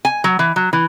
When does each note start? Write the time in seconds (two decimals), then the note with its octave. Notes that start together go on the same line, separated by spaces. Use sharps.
0.05 G#5
0.24 F#3
0.39 E3
0.56 F#3
0.73 E3